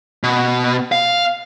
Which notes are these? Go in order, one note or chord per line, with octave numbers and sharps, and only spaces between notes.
B2
F5